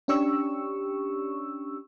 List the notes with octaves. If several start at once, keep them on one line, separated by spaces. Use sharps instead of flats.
C#4 D4 G4 C#6 E6